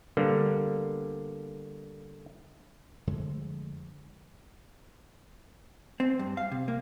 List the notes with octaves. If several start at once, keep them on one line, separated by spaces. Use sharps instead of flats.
D3 G3 A#3 B3
F2 D3 G#3 A3
C4
G2
F5
C3
A#3